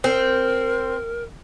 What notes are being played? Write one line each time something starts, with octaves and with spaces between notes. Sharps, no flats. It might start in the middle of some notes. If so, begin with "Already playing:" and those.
C4 A#4